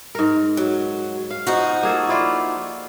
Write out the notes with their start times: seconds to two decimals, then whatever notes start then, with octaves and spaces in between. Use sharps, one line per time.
0.15 G#2 A#4
0.57 F#3
1.30 F5
1.47 F3 D#4 F#4
1.83 A#3 G#4 A4
2.09 E4 F4 D5